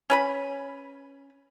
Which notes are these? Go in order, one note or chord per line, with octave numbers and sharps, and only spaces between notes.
C#4 B4 B5